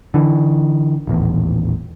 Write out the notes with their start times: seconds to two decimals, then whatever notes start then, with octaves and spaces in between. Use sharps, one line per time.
0.14 D3 E3
1.07 D#1 A1 E2